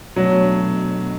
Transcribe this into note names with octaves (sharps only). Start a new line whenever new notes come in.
B2 F#3 A3 D4